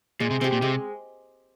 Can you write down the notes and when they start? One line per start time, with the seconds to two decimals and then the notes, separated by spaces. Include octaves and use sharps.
0.20 A#2 G#3
0.31 C3
0.41 C3 C4 G4
0.52 A#2
0.62 C3 G#3